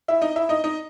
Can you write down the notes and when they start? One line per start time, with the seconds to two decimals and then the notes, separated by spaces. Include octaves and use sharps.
0.08 E4 E5
0.21 D#4 D#5
0.36 E4 E5
0.49 D#4 D#5
0.64 D#4 D#5